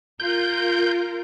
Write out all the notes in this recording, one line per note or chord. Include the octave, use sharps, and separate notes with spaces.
F4 A#4 G6